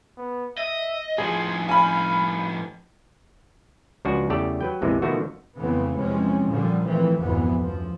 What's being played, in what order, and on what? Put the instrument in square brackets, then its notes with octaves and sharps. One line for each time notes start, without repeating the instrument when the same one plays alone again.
[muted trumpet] B3
[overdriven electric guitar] D#5 [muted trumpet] E5
[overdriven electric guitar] A2 F3 [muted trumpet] F4 [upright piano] G#4
[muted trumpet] F5 [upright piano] G#5 B5
[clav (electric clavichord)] C#2 F3 D4 F#4 G#5
E2 C#3 A3 G4 D5 A5
F#3 B4 G5
A#1 E2 C3 E3 G#3
B2 D3 D#3 F3 A3 F#4
[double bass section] F2 C#3 E3 A3 B3 C4
E2 C3 F3 G#3 C#4
A#2 D3 F3 G3
E3 F3 A3 C4
F1 D2 G#2 E3 F3 B3
F#2 F3